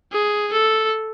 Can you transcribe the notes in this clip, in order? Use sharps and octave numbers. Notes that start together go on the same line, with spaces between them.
G#4
A4